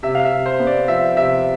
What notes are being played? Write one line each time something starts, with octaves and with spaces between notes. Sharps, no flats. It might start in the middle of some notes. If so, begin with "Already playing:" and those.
C3 E5
F5
E5
C3
C5
B3
D5
F3 E5
C3 E5